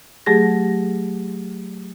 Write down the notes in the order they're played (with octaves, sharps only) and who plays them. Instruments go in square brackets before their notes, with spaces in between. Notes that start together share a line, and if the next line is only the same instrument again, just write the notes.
[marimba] F#3 A3 G4 G#4 A#6